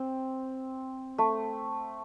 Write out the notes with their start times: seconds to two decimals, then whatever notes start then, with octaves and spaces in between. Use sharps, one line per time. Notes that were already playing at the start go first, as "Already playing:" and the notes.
Already playing: C4
1.18 A3